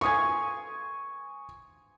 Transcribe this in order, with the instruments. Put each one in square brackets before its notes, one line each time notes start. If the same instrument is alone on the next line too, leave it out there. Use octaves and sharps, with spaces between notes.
[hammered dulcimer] G#5 C6 [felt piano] C#6 D#6 G#6